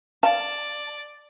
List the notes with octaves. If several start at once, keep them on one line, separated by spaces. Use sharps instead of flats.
D5 F5 A5